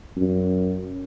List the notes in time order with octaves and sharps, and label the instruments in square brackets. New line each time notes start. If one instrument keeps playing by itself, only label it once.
[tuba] F#2